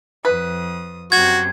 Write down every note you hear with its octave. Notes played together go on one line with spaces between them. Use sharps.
F2 B4 D#6
F#2 C3 F#4 G#6